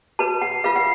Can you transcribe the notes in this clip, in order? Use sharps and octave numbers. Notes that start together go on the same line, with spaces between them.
F#4 B4 A5
F#5
F4 B4 F5
F#5